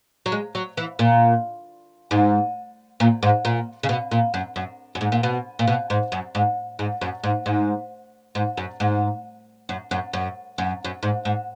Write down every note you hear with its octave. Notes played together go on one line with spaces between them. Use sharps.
F#3
G#3
F#3
E3
A#2
G#2
A#2
G#2
A#2
C#3
B2
A#2
F#2
F#2
F#2
G#2
A#2
B2
A#2
B2
G#2
F#2
G#2
G#2
F#2
G#2
G#2
G#2
F#2
G#2
F#2
F#2
F#2
F#2
F#2
G#2
G#2